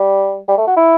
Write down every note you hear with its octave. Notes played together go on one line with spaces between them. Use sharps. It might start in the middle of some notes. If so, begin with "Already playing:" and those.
Already playing: G3
G3
A3
F#4
E4